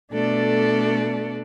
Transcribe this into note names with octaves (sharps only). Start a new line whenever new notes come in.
B2 A3 D4 A4 D5